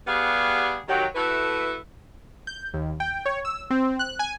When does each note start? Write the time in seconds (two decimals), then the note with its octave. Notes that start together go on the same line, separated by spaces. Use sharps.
0.06 G3 B3 G4 G#4 F5 F#5
0.88 D#3 F#3 G4
1.15 A3 E4 F#4 A4 B4
2.47 G6
2.74 D#2
3.00 G5
3.26 C#5
3.45 E6
3.70 C4
3.99 F#6
4.19 G#5